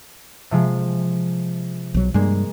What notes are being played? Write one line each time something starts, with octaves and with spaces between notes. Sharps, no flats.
C3 F3 G#3
B1 F#3
G2 G3 G#3 A#3